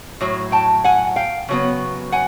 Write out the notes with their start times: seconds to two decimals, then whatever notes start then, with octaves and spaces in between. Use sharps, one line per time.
0.21 A2 F#3
0.52 G5 A5
0.84 F#5 G#5
1.16 F5 G5
1.49 C#3 F#3 B3
2.12 F#5 G#5